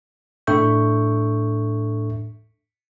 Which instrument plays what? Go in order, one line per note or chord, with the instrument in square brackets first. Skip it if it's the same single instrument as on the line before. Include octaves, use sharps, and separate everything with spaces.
[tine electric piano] A2 D4 A4 E5 C#6 G6